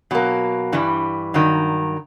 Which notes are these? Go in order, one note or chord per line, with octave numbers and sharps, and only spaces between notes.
B2 F#3 A#3
G2 E3 G3
G2 D#3 F#3